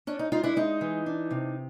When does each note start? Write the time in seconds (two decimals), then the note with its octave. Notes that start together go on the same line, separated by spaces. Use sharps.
0.07 C#4 D4
0.19 D#4
0.32 G#3 D#4 F4
0.43 D4 E4
0.56 G#3 D#4
0.81 E3
1.06 D4
1.31 C3